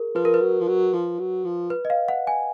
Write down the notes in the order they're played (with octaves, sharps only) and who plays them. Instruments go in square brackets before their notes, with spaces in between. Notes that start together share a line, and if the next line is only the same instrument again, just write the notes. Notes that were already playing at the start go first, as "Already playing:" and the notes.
Already playing: [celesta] G#4 A#4
[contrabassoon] F3 [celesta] B4
[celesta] A#4
B4
[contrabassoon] F#3
F3
F#3
F3
F#3
F3
[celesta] B4
D#5
F5
F#5
G#5